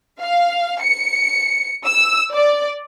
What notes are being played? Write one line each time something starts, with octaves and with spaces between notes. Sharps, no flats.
F5
C#7
E6
D5